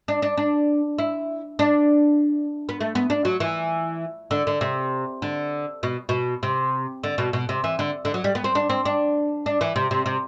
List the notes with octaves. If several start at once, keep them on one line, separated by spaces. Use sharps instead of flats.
D4
D4
D4
E4
D4
B3
A3
B3
D4
F#3
E3
D3
D3
C3
D3
B2
B2
C3
D3
B2
B2
C3
E3
D3
D3
F#3
G3
B3
C4
D4
C4
D4
D4
E3
C3
C3
C3